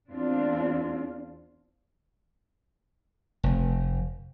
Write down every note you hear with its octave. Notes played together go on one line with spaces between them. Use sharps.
E2 C4 D4 F4
F1